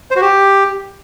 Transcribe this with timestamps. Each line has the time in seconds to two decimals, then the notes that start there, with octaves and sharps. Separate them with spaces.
0.11 C5
0.16 F#4
0.21 G4